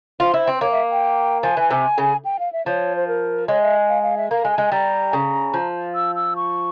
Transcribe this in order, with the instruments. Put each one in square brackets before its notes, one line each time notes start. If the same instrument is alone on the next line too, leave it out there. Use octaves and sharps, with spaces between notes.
[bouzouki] F4 [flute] C5
[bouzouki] E4
C4
[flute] C5
[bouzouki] A#3 [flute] C#5
[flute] E5
G5
[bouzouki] F3 [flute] G#5
[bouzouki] E3
C3
C#3
[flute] G5
F5
E5
[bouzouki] F3 [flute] C#5
[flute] C5
A#4
[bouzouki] G#3 [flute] C#5
[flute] E5
F5
F5
E5
[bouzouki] A#3 [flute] F5
[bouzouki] G#3
[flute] G#5
[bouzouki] G#3
[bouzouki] G3 [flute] A#5
[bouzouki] C#3
F3
[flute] E6
E6
C#6